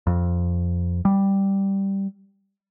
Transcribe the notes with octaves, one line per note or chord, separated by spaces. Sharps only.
F2
G3